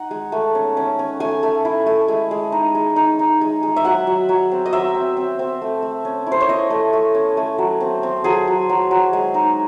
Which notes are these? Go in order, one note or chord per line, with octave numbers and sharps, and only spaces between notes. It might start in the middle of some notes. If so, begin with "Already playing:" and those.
Already playing: D#4 F#5
G#3
A3
C#4
C#4
C#4
A3 G#5
A3
E4
A3
G#3
G#3
D#4
G#3
D#4
D#4
G#3
G#3
E5
F#3 F#5
F#3
F#3
C4
D#5
F#3 E5
C4
C4
C4
A3
A3
C#4
E4
C5
C#5
E4 D#5
A3
A3
C#4
A3
F#3
C4
C4
F#3 G#4
F#3
F#3
F#3
G#3
D#4